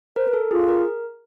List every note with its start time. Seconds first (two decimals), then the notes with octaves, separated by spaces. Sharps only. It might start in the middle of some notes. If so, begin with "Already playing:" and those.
0.16 A#4 C5
0.28 B4
0.33 A4
0.51 F4 G#4
0.68 A#4